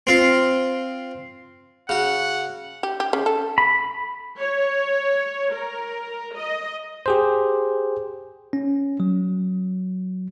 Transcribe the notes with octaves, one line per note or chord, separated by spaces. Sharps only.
C4 F4
C#3 F#4 F#5
G4
G4
C#3
A4
B5
C#5
A#4
D#5
G4 G#4 C5
C#4
F#3